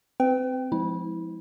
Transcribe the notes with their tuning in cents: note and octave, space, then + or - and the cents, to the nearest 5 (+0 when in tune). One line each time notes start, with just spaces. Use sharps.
C4 -20 B4 +40 G5 +0
F3 +0 G#3 +0 E4 -25